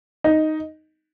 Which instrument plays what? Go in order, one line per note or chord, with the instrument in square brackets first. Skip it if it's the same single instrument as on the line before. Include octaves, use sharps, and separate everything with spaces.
[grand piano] D#4